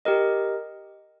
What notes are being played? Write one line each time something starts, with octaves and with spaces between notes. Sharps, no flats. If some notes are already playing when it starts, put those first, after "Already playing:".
G4 A#4 D#5